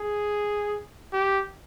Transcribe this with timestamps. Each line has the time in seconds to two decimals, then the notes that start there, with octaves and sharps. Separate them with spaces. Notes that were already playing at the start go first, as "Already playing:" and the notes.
Already playing: G#4
1.13 G4